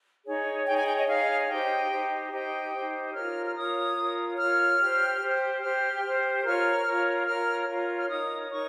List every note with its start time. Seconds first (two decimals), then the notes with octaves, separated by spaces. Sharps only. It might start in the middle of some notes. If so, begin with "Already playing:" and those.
0.26 D#4 G#4 C#5
0.66 D#4 G#4 C#5 G5
0.77 G#5
0.87 G5
0.98 D#5
1.08 D#4 G#4 C#5 F5
1.49 D#4 G4 C5 G5
1.90 D#4 G4 C5
2.32 D#4 G4 C5 G5
2.73 D#4 G4 C5
3.14 F4 A#4 C#5 F6
3.46 F6
3.56 F4 A#4 C#5 D#6
3.96 F4 A#4 C#5
4.38 F4 A#4 C#5 F6
4.80 G4 C5
5.20 G4 C5
5.61 G4 C5 F6
6.03 G4 C5
6.44 F4 A#4 C#5 F6
6.85 F4 A#4 C#5
7.26 F4 A#4 C#5 F6
7.67 F4 A#4 C#5
8.00 F6
8.09 D#4 A#4 C#5 D#6
8.50 D#4 A#4 C#5 C#6